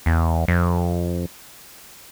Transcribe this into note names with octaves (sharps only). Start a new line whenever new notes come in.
E2
F2